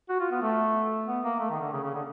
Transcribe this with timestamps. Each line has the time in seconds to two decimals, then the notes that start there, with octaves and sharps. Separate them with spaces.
0.09 F#4
0.20 F4
0.31 B3
0.42 A3
1.07 B3
1.24 A#3
1.40 A3
1.50 D#3
1.61 D3
1.72 C#3
1.83 C#3
1.94 D3